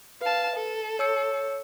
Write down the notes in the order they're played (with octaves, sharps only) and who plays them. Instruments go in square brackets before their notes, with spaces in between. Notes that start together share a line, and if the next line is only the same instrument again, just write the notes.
[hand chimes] B4 [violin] F5 A5
[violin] A4
[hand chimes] C#5 E6 C#7